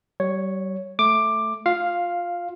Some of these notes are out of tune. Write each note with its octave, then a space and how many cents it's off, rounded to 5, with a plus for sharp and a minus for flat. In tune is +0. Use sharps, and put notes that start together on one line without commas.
G3 -35 C#5 +0
A3 -5 D6 +10
F4 +15 F5 +0